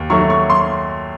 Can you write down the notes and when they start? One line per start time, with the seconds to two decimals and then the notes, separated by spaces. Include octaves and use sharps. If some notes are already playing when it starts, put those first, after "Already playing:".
Already playing: D#2
0.10 D#3 F#3 A3 C#6
0.30 C#6
0.50 C6